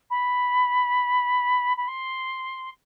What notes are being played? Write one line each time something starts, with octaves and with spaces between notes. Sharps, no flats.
B5
B5
C6